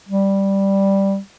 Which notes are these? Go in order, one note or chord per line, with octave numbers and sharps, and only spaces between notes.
G3